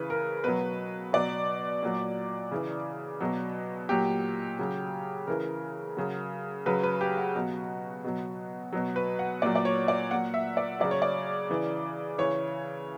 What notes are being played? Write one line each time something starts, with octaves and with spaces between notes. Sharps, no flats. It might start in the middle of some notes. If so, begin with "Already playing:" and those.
Already playing: C#3 E3 B4
A#4
B2 F#3 B4
B2 F#3 D5
A#2 F#3
C#3 E3
B2 F#3
A#2 F#3 G4
C#3 F#3
C#3 E3 A#4
C#3 F#3
C#3 F#3 B4
B4
G4
F#4
B2 F#3
B2 F#3
B2 F#3
B4
F#5
A#2 F#3 D5
D5
C#5
D5
A#2 F#3 F#5
E5
D5
C#3 F#3 D5
C#5
D5
C#3 E3
C#3 E3 C#5